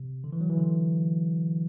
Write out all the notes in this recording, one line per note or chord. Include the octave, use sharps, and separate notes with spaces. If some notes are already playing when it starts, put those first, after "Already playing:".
Already playing: C3
D3
E3
F#3
E3
D3